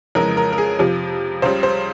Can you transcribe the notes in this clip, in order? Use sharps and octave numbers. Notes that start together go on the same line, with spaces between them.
F2 C#3 E3 G#3 A#4
A#4
A#4
G#4
F2 C3 F3
C#2 C#3 G3 C5
C5